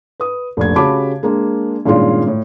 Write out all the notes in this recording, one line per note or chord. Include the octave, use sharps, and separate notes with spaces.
B4 D#6
F1 A#1 G#6
C#3 F#4 G4 A5 B5 D6
G#3 A#3 D4
G2 A#2 D#3 G#3 C#4 F4
A2